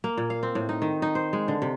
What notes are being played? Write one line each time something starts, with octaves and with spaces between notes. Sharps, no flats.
A#3
A#2
F5
C4
A2
D#4
D#3
D#4
C5
G#3
D3
C3